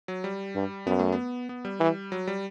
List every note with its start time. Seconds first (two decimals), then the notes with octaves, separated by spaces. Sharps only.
0.08 F#3
0.24 G3
0.55 G2
0.86 F#2 B3
0.99 A3
1.12 B3
1.49 B3
1.65 G3
1.80 E3
2.12 F#3
2.27 G3